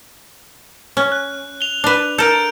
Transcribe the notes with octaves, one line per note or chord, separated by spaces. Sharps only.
C#4
F#6
F7 G7
D4 B4
A4 A#4 G6 D7